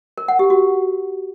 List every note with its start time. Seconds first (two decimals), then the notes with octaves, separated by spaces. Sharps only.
0.18 A#4
0.28 F#5
0.39 G4
0.50 F#4